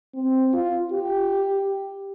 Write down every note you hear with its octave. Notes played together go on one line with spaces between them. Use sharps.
C4
F4
G4